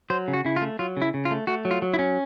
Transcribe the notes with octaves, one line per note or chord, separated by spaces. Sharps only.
F#3 C5
C#3
F#4
C#3 E4
F4
A3
F#3 F4
C#3 E4
C#3
F4
A3
A3 F#4
F#3
F4
F#3
E4
C#4